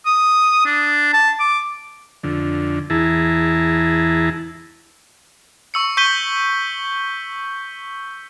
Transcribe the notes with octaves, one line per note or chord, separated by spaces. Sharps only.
D#6
D4
A5
D6
F2 D3
E2 E4 G#4 A5 A#5
C#6 E6 C#7
C#6 G6 B6 D#7 G7